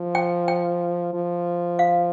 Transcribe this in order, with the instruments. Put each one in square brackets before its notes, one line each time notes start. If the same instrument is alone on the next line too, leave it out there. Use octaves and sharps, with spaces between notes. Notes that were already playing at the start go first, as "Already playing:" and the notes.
Already playing: [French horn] F3
[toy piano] G5
G5
[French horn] F3
[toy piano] F5